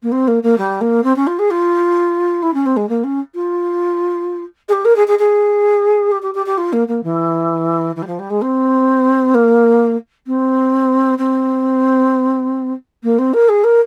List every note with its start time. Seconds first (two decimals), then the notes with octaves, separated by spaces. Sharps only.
0.03 A#3
0.12 C4
0.28 A#3
0.43 A#3
0.58 G3
0.81 A#3
1.04 C4
1.16 C#4
1.27 F4
1.39 G#4
1.51 F4
2.43 E4
2.54 C#4
2.66 C4
2.77 G#3
2.89 A#3
3.04 C#4
3.35 F4
4.69 G#4
4.73 G4
4.85 A#4
4.96 G#4
5.08 G#4
5.19 G#4
6.12 G4
6.22 G4
6.35 G4
6.46 G4
6.58 F4
6.73 A#3
6.88 A#3
7.04 E3
7.96 E3
8.02 G3
8.07 F3
8.19 G3
8.30 G#3
8.42 C4
9.35 A#3
10.27 C4
11.18 C4
13.03 A#3
13.19 C4
13.34 A#4
13.49 G#4
13.64 A#4